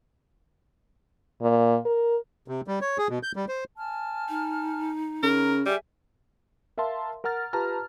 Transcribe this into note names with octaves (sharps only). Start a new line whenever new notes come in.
A#2
A#4
C3
G3
C#5
G#4
B2
G6
G3
C5
G#5 A5 F6
D#4
C#3 A#4 A#5
G3 G#4 E5 G#5
A#4 E5 F5 A5 C6
A#4 F#5 A#5 F6 A6
F4 G4 B4 A5 A#5 F6